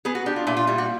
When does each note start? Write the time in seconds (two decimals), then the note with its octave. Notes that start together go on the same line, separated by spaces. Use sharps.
0.05 B3 G#4
0.15 F#4
0.26 D4 G4
0.36 F4
0.47 A#2 E4
0.57 F4
0.67 G3 E4
0.78 F#4